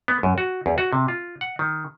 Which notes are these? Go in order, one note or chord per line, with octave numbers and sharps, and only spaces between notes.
B3
F#2
F#4
E2
F#4
C3
F4
F#5
D#3